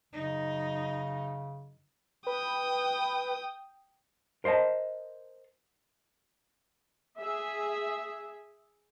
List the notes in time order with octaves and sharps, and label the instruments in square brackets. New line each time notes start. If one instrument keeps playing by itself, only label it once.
[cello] F#2 D#4 [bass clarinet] C#3
[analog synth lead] B4 [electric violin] G5 D#6
[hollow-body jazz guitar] A#4 C5 D5 D#5 A5
[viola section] G#4 E5